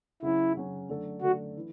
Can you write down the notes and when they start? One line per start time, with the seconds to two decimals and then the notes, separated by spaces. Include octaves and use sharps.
0.22 C#3 F#3 C#4 E4
0.55 C#3 F#3 C#4
0.89 D3 F#3 A3 D4 A4
1.22 D3 F#3 A3 D4 F#4 A4
1.57 E3